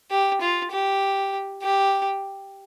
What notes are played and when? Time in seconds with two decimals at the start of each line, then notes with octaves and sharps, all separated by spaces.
0.11 G4
0.41 F4
0.71 G4
1.62 G4